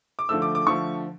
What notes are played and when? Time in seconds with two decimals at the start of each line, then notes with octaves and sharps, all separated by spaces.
0.19 D6
0.29 D3 F3 A3 E6
0.42 D6
0.55 D6
0.67 D3 F3 A3 C#6